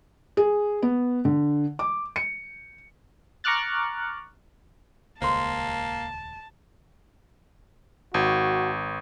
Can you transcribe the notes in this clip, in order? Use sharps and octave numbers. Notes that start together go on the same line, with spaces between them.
G#4
B3
D3
D6
C#7
A#5 C#6 D6 F6 F#6 A6
D#1 C#2 A#3 C5 A5 C6
G#1 F#4